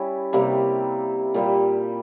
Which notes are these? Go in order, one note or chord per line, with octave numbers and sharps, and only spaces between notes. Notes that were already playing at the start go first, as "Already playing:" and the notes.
Already playing: G3 C#4 E4
C3 G3 A#3
A#2 G3 A#3